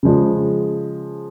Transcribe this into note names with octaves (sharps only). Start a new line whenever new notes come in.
C#3 F3 G#3